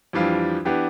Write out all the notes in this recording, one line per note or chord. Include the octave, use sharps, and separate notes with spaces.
F2 E3 G3 D4 F4
E3 B3 D4 G4